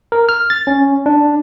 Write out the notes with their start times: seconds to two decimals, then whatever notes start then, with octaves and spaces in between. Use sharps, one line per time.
0.12 A#4
0.29 F6
0.50 A6
0.67 C#4
1.06 D4